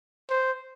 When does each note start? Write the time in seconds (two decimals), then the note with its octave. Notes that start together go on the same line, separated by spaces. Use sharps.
0.30 C5